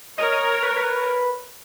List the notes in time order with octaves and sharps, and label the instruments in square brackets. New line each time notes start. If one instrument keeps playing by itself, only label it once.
[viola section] A#4 C#5 [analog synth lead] D#5
[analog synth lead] D#5
B4
B4